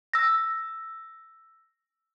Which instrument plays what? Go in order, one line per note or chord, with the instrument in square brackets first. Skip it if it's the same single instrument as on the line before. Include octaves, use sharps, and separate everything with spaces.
[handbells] E6 A#6